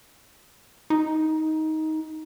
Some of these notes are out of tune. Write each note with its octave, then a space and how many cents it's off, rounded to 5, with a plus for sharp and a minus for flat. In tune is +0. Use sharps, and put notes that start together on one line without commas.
D#4 +15